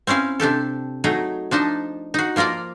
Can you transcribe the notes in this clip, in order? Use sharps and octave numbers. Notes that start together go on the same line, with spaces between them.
C4 C#4 E4 F5 G#5
C3 D4 G4 A4
F#3 A3 D#4 G#4
F3 D4 D#4 A5
D#4 F#4
F3 A#3 F4 A#4 D5